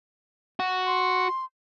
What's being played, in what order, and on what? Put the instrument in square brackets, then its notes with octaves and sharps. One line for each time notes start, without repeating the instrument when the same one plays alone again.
[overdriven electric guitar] F#4
[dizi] C6